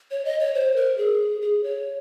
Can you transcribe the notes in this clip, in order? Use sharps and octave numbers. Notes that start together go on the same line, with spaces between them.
C#5
D#5
C#5
C5
A#4
G#4
G#4
C#5